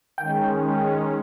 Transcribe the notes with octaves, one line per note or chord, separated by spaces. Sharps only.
D#3 G#3 C#4 G5